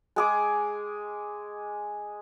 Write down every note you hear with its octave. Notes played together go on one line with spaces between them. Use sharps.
G#3 G#4 D6